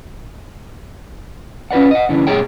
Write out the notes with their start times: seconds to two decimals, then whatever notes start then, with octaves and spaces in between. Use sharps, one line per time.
1.71 C#4 F4 B4 D5 F#5
1.91 D#5 F#5
2.09 C#3 E3 D4
2.27 G#2 B2 G4 G#4 C#5 G5